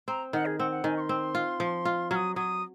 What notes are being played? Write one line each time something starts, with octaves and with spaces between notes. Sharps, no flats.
C4 A#5
D#3 F#5
G#4
C4 F#5
F#5
D#3 G#5
C#6
C6
C4
F4
F3
F4
F#3 D#6 F6
F#3 D#6